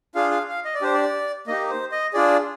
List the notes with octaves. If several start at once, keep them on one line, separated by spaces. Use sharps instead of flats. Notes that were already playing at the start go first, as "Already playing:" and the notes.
D4 F4 G#4 F5
F5
F5
D#5
D5
D4 G4 C5
D5
A#3 D#4 G4 D#5
C5
D#5
D4 F4 G#4 D5